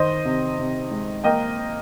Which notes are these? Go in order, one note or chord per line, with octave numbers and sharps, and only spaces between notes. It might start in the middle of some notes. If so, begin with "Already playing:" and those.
Already playing: D#3 C5 D#5
C3
C3
G#3
A#3 D#5 G5